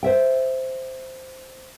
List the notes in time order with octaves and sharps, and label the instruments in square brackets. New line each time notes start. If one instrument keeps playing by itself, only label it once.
[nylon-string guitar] C5 E5 G5